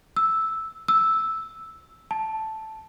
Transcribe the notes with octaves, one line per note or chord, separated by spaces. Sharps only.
E6
E6
A5